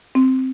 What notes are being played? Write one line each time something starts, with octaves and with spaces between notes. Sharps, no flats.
C4